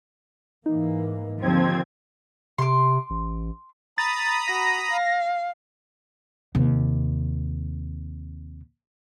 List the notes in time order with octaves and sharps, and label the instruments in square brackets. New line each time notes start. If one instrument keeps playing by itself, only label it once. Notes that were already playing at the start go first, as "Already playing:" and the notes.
[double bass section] G#2 E3 A#3 [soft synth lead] D#4
[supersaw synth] D#2 C4 G#6 [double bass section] D3 [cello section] F3
[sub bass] C3 [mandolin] C6 D6
[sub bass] A1
[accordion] A#5 B5 D#6 [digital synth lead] A6
[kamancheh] F#4 [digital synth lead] A#6
[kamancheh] F5
[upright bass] D#2 C3